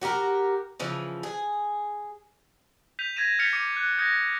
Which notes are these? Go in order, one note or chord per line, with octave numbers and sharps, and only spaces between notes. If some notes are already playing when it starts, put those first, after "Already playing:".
F#4 G4 A4 A#4
C#3 E3 F3
G#4
G6 B6 D#7 F7
G#6 A#6 B6 D#7 E7
F6 G6 A6 B6 C#7 F7
D6 C#7 D#7
F#6
D#6 G6 G#6 A#6 C#7